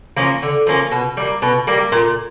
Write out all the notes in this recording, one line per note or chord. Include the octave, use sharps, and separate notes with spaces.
F3 A#3 C#4
D3
F3 A#3 C#4
B2
G3 A#3
B2
G3 A#3
A#2